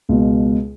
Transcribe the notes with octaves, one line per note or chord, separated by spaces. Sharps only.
C#2 B2